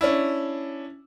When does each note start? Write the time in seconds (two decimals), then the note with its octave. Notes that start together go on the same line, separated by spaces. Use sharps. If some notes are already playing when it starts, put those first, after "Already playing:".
0.01 C#4 D4 E4